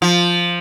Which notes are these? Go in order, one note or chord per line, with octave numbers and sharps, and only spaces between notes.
F3